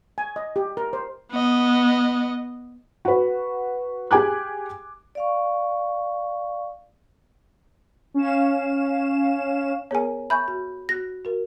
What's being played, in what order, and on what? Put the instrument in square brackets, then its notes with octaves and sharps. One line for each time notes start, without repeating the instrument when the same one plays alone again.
[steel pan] G#5
D#5
G4
A#4
C5
[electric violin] B3 D#5
[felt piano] F#4 B4
G4 G#4 G#5 D6 F#6
[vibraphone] D5 F5 C#6
[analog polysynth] C#4 F5 E7
[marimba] B3 G#4 A#4 [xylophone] C#5 G#5
[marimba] E5 G#5 C#6 [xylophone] B5 G6
[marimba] F#4
[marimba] F#4 F#6 [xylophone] A#6
[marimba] F#4 A#4